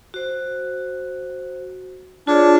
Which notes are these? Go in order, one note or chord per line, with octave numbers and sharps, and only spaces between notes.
F#4 C5
D4 F4 G#4 C#5